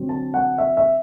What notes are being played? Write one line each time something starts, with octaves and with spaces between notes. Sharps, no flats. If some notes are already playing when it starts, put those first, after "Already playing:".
Already playing: D3 F#3 C4
A5
F#5
E5
E5